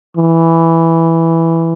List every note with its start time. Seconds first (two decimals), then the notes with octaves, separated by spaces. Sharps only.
0.16 E3